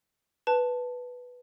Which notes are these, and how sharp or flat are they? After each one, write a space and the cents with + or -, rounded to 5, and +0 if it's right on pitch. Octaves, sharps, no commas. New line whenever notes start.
B4 +0 A5 +0